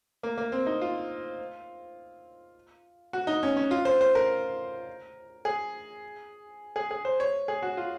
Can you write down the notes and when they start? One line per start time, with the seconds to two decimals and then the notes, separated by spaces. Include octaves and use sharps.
0.23 A#3
0.38 A#3
0.52 C4
0.66 D#4
0.81 F4
3.13 F#4
3.27 D#4
3.43 C#4
3.57 C#4
3.71 F4
3.85 C5
4.01 C5
4.15 A#4
5.45 G#4
6.76 G#4
6.91 G#4
7.05 C5
7.20 C#5
7.48 G#4
7.62 F#4
7.77 F4